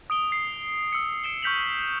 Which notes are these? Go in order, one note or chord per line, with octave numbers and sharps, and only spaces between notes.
D#6 D7 G7
C7
E6 C#7
C7 D7 E7 G7
C#6 F6 G6 B6 F7 F#7